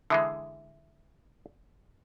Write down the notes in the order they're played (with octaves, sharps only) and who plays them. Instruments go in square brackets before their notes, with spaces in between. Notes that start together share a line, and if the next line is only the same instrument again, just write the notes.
[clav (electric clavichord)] D3 E3 G#3 [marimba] E5 D#6